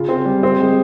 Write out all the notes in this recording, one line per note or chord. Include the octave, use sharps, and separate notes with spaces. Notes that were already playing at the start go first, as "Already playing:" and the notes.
Already playing: C#3 F4
C4
G3
C4
G#3